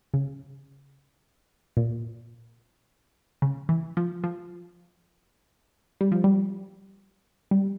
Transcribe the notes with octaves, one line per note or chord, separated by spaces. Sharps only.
C#3
A#2
C#3
E3
F3
F3
G3
F3
G3
G3